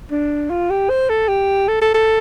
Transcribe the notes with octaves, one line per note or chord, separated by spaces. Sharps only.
D4
F4
G4
C5
A4
G4
A4
A4
A4